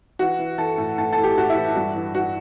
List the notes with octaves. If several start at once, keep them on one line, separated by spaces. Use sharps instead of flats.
E3 F#4
E3
E3 A4
A2
A2 A4
A2 A4
G4
A2 F#4
E4
E3
G2 F#4
E3
E3 F#4